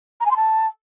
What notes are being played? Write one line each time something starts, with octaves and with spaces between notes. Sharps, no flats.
A#5
G#5
C6
A5